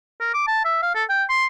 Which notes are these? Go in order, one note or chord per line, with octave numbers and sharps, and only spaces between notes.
A#4
D6
A5
E5
F5
A4
G5
C6